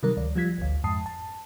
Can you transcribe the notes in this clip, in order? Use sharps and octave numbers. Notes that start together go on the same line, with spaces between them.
C3 D#3 F#3 G3 A#4
D2 D5
F3 G3 F4 G#6 B6
G#1 D2
F2 G#2 A5 D#6 C7
A5